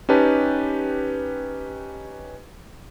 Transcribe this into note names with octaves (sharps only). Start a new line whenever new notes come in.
C#4 D#4 G4 B4 A5